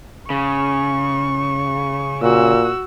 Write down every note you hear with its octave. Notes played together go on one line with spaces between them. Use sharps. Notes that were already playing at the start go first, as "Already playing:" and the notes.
C#3 C#6
A#2 F#4 E6